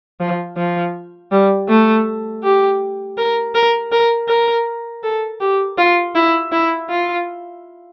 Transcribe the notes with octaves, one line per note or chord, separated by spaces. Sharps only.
F3
F3
G3
A3
G4
A#4
A#4
A#4
A#4
A4
G4
F4
E4
E4
F4